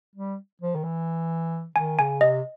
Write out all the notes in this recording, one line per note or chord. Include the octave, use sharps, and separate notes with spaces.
G3
F3
D#3
E3
D#3 G#5
C#3 G#5
C3 D#5